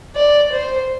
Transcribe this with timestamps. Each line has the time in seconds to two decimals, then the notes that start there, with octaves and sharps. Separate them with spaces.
0.15 D5
0.52 C5